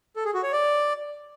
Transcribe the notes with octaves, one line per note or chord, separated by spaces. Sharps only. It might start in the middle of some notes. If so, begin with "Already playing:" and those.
A4
G#4
F#4
C#5
D5